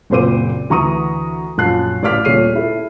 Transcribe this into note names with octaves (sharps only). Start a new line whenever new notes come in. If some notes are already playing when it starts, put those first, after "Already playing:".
F#1 A#2 C4 C5 D6 D#7
D2 E3 A#5 C#6 D#6 D#7
A#1 F#2 A5 F#6 C7
A1 D5 F5 D6 F6 B6
D#1 A#2 A3 C#5 C7 D#7
E4 A4